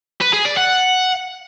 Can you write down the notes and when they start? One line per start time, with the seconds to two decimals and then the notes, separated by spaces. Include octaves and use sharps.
0.21 B4
0.33 G#4
0.45 D5
0.57 F#5